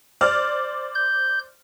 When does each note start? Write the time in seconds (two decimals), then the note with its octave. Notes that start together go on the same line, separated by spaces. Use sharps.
0.21 C5 D5 F6
0.95 G6